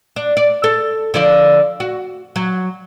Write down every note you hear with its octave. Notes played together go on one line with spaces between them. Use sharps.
D4
D5
A4
D3 F3 D5
F#4
F#3